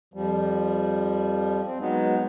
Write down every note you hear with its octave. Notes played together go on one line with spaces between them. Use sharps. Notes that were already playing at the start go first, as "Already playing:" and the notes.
F2 F3 G3
C4
F#3 G#3 B3 D#4